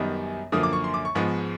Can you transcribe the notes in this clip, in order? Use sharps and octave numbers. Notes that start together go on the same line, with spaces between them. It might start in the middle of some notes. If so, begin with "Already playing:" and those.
Already playing: F#2 D#3 G3 B3 D#4
F#2 D3 F3 A#3 D#6
D6
C#6
C6
D6
C#6
G#2 F3 G#3 B3